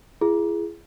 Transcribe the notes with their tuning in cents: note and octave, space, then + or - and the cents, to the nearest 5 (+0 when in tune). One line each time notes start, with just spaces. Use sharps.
E4 +45 G#4 +5